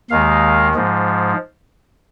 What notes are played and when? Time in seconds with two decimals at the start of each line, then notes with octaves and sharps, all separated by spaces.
0.10 D#2 D#3 G#3 F5
0.74 G#2 F3 G#3